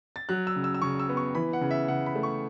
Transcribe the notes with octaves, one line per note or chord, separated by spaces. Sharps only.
A6
F#3 F#6
E6
C#3
E6
E6
C#3 C#6
E6
B3
C#6
E3 B5
F#5
C#3
E5
C#3 F#5
B5
A3
C#6